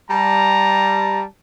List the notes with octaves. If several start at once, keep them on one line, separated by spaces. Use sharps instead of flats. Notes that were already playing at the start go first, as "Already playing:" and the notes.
G3 A5 A#5